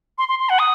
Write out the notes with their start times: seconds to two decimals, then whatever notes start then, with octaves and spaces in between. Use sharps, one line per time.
0.18 C6
0.29 C6
0.39 C6
0.49 F#5
0.59 D#6